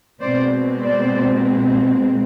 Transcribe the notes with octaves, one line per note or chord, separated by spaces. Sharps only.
B2 G#3 C4 C5 D5
C5 D5